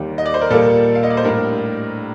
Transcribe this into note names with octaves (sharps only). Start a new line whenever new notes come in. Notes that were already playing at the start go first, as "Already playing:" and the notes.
Already playing: D#2 D#3 G3
D#5
D5
C5
A#4
A#2 G3 A#3 A4
F5
D#5
D5
C5
A2 G3 D4 A#4